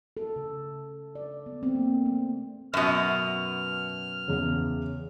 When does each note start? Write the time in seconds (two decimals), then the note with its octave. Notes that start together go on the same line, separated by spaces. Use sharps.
0.17 A4
0.36 C#3
1.15 D5
1.46 B3
1.63 C4
1.75 A#3
2.06 A3
2.74 F#2 B2 E5 D#6 F6
4.28 E2 C#3